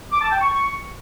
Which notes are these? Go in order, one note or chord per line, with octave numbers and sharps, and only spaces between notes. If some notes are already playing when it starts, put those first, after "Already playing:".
D6
A5
G5
C#6